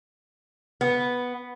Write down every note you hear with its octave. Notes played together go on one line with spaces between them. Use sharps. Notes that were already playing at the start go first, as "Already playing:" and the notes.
B3